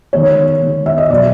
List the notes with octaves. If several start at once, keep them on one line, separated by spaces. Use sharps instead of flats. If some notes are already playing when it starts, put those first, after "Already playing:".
D#3 G#3 B3 C#5
D#3 G#3 B3
E5
D#5
B2 F#3 B3 D5